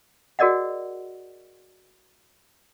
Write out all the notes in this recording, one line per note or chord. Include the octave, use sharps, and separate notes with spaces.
F#4 G#4 A#4 D5 D#5 F#5